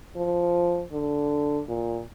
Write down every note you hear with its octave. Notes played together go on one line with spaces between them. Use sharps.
F3
D3
A#2